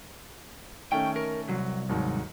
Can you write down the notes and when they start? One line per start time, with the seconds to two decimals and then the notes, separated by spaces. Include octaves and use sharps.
0.92 D#3 A3 C#4 G5
1.16 A#4
1.49 C2 F#3
1.89 D#2 G#2 F#3